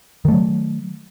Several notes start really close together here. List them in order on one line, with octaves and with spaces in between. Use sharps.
D#3 A3 F#3